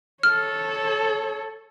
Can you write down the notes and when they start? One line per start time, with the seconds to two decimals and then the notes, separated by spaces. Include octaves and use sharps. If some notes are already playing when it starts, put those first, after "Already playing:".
0.23 A4 C#5 F6